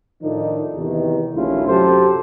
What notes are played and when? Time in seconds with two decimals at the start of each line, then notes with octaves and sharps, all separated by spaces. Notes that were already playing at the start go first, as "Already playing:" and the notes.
0.22 A2 D#3 F3 A3 D4 D#4
0.75 E2 C3 D#3
1.35 A#1 D#2 A3 C#4 E4 F4
1.67 F#2 C3 F#3 G4 A4 C5